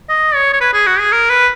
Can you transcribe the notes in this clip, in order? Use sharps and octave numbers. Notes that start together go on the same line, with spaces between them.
D#5
C#5
C#5
B4
G#4
F#4
G#4
A#4
B4